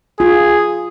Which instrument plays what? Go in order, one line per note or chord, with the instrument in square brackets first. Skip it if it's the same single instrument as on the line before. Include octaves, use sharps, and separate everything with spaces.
[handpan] F4 [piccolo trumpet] G#4